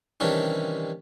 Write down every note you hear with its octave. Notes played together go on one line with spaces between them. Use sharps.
C3 D#3 E3 G3 C#4 D4